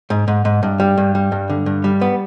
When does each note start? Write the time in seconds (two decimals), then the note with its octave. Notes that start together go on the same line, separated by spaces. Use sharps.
0.10 G#2
0.28 G#2
0.45 G#2
0.63 G2
0.80 G3
0.98 G2
1.15 G3
1.32 G2
1.50 D3
1.66 G2
1.84 G3
2.01 B3